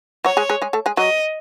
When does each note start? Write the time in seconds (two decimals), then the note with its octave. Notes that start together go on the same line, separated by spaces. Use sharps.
0.25 F#3 F#4 C#5
0.37 G#3 G#4
0.49 G#3 G#4
0.62 G#3 G#4
0.73 A3 A4
0.86 G#3 G#4
0.97 F#3 F#4 D#5